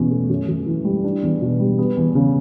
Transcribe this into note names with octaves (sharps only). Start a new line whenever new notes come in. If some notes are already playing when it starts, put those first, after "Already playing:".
Already playing: E2 B2 C#4
A3
F#2
F#2
E3
G3
D4
E2
B2
G3
B3
E2
C#3